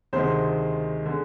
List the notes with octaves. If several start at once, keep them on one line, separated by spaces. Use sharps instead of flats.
D2 C3 D#3 G#3 C5
D3 G#3